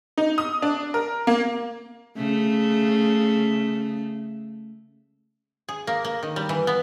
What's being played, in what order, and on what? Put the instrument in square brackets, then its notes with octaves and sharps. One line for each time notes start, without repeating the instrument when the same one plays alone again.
[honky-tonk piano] D#4
D#6
D4
A#4
A#3
[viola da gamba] C#3 A3
[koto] G#4
A#3
A#3
D#3
G3
E3
B3